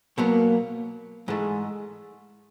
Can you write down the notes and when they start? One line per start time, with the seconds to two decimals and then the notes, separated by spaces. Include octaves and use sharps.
0.18 B2 F#3 A#3 B3
1.28 G#2 E3 G#3 A3